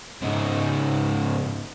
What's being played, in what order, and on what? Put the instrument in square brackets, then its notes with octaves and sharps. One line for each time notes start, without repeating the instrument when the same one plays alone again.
[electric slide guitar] G#2 C#3 D#4